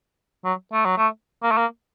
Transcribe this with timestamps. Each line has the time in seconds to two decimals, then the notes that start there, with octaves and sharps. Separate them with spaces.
0.45 F#3
0.73 A3
0.85 F#3
0.98 A3
1.43 A#3
1.51 A3
1.58 A#3